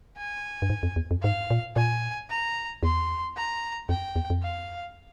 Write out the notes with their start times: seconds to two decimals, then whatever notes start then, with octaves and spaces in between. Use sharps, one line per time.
0.17 G#5
0.62 G2
0.70 G#2
0.83 F2
0.96 E2
1.11 F2
1.23 G#2 F5
1.51 A#2
1.76 A#2 G#5
2.30 A#5
2.83 E2 C6
3.37 A#5
3.89 F2 G5
4.16 E2
4.30 F2
4.42 F5